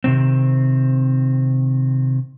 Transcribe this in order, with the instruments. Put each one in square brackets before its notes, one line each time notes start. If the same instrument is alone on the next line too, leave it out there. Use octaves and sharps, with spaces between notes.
[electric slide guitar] C3 D#3 C4